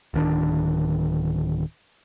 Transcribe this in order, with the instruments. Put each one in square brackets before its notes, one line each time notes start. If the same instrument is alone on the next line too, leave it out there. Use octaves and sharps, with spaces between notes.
[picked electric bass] D1 D#3 D4